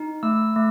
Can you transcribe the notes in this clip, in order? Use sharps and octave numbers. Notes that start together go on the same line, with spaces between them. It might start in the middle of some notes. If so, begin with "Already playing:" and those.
Already playing: D#4
A3 E6
A3